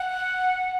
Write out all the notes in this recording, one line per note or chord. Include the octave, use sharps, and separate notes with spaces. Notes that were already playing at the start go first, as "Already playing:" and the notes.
Already playing: F#5